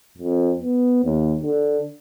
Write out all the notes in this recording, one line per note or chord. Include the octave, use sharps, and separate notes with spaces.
F2
B3
D#2
D3